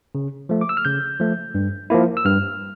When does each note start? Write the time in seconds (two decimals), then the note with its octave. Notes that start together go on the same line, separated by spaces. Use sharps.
0.15 C#3
0.49 F3 A3
0.61 D6
0.69 E6
0.77 F6
0.85 C#3 G6
1.20 F3 A3
1.55 G2
1.90 F3 A#3 E4
2.17 E6
2.24 G2 F6